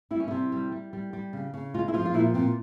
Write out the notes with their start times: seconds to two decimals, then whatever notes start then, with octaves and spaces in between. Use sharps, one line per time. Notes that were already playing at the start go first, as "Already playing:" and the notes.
0.11 G3 E4
0.20 C#4
0.28 C3 E4
0.52 G3
0.72 G3
0.93 G3
1.13 G3
1.33 C#3
1.54 C#3
1.74 G#3 F4
1.88 E4
1.94 F3 F4
2.06 F4
2.14 A#2 E4
2.34 A#2 C4